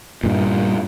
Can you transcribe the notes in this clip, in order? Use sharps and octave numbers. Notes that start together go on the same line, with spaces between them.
G2 A#2